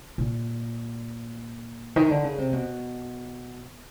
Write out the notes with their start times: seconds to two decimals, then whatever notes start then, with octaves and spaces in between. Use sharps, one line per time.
0.18 A#2
1.96 D#3
2.10 D3
2.24 C#3
2.38 C3
2.53 B2